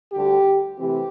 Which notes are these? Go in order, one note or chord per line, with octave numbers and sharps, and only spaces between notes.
D2 D3 G3 G4
C3 E3 A3 C4 G4